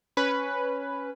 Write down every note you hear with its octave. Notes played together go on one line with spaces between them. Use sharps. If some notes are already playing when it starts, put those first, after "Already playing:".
C#4 B4